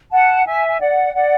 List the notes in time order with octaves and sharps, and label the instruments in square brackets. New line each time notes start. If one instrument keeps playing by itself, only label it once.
[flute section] F#5 A5
E5 G#5
G#5
D5 F#5
D5 F#5